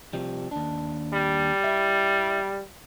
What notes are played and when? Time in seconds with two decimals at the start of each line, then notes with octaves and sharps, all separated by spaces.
0.13 C3 F3 G3
0.51 D#2 D4
1.13 G3
1.64 E4 E5